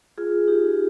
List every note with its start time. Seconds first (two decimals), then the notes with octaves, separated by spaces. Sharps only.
0.18 F4 G#4
0.48 D#4 G4